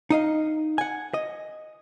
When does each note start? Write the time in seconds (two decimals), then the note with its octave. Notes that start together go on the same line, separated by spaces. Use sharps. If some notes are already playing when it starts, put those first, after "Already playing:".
0.10 D#4 D#5 F5
0.78 F#5 G#5
1.14 D#5